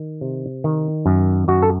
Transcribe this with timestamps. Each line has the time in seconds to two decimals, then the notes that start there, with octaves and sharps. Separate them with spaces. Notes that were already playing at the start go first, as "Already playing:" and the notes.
Already playing: D#3
0.21 C3
0.64 D#3
1.06 F#2
1.48 F#2 F#4
1.62 A4